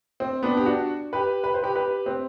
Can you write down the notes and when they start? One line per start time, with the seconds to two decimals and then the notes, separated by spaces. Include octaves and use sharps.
0.20 C4
0.43 B3 D4
0.57 G4
0.66 D4 F#4
1.13 G4 B4
1.44 B4
1.54 C5
1.62 G4 B4
1.75 G4 B4
2.06 C4